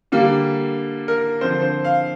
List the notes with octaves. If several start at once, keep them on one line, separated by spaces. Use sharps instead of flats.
D3 G3 A#3
A#4
D3 F3 C4 C5
C5
F5